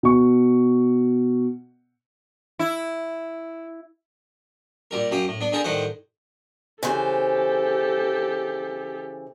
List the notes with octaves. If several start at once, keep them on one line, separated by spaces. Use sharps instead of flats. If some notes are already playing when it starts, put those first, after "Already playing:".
B2 C#6
E4
A#2 G3 A#4
F#2 G4 F5 D#6
A2
B3 D4
D3 G#4 A#4 G5 A5 A#5
A2 D#3 G3 C5 F#5
C#3 E3 G4 A4 C5